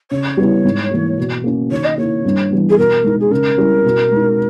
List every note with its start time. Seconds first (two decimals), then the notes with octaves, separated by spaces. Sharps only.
0.11 C#3 C#5
0.37 G3 B3 E4
0.65 G#2
0.91 E3 A#3
1.18 B2
1.44 A#3 C#4
1.71 D#3 C#5
1.84 D#5
1.98 A#3 E4 C#5
2.25 G2
2.51 E3 G3 B3
2.69 G#4
2.78 B2 A#4
3.04 G#3 D#4
3.20 G#4
3.31 C#3 A#4
3.58 G3 C#4 E4
3.84 B2
4.11 G#3 D#4